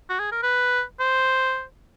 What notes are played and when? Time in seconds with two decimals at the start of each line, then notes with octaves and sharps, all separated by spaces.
0.09 F#4
0.19 G#4
0.32 A#4
0.43 B4
1.00 C5